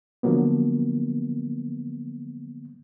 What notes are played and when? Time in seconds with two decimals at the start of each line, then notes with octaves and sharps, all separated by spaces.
0.23 D3 F3 F#3 A#3 B3